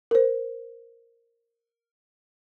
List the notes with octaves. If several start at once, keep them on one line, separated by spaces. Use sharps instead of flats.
A#4 C5